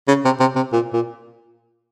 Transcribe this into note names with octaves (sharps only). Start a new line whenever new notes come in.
C#3
C3
C3
C3
A#2
A#2